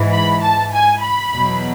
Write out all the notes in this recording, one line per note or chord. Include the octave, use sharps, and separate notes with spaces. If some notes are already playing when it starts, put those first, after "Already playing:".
Already playing: G#2 E3
B5
A5
G#5
B5
E2 B2 F#3